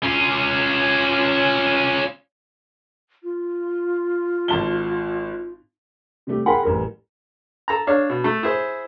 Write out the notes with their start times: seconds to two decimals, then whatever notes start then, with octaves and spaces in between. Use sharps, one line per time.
0.03 C#4 F4
3.23 F4
4.48 G#1 A5 G7
6.27 C3 G3 A3 G4
6.46 G#4 A#4 F#5 G5 B5 C6
6.63 A1 G3 A#4
7.68 A4 A#5
7.87 D4 C#5 F5
8.09 B2
8.24 A3
8.43 E4 G#4 C5